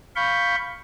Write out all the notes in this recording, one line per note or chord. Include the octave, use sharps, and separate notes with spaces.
F5 B5 C#6 G6